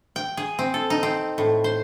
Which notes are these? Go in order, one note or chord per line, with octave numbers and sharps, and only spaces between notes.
G5
G#4
C4
A4
D#4
C4
A2
C5